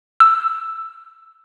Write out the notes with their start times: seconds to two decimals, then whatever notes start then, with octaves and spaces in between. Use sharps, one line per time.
0.20 E6